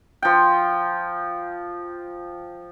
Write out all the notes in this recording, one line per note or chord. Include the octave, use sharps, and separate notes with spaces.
F3 G5